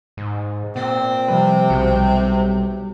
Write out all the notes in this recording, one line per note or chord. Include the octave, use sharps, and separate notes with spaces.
G#2
A#2 C4
C3 F3 G3 B4
B1 G3 F#4